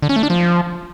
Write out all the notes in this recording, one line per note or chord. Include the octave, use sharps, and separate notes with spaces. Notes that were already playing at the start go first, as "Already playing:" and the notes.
D3
C#4
A3
D4
F3